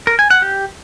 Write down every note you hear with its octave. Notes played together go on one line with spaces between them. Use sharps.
A#4
G#5
F#5
G4